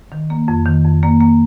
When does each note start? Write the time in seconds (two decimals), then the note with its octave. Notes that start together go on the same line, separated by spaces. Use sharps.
0.12 D#3
0.30 A#3
0.48 F2
0.66 D#3
0.85 F2
1.03 A#3
1.21 A#3